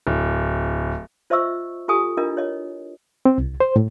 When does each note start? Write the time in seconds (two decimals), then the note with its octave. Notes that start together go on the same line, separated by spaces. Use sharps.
0.07 D1
1.30 F4 C5 D#5 E5 C#6 E6
1.88 F4 G4 A4 G#5 D#6
2.17 D4 E4 F4 A#4 D#5
2.37 C#5 D#5
3.25 C4
3.38 C2
3.60 C5
3.76 A2